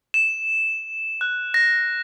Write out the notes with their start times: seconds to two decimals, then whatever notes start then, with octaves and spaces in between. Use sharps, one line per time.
0.14 E7
1.21 F#6
1.54 A#6